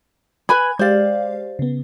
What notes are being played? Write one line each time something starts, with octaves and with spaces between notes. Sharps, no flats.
B4 G#5 B5 G#6
G#3 G4 C5 D5 F5
C#3 B3